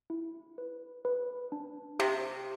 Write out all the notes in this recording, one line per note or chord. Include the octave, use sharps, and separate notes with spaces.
E4
B4
B4
D4
C3 G4